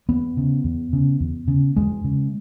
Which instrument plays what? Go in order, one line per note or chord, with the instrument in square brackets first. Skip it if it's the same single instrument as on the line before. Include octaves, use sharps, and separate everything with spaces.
[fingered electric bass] E2 B3
C#3
E2
C#3
E2
C#3
E2 G#3
C#3